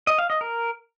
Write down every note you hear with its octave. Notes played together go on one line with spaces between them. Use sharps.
D#5
F5
D#5
A#4